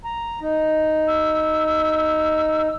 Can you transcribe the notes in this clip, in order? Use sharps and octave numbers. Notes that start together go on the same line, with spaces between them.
A#5
D#4
E6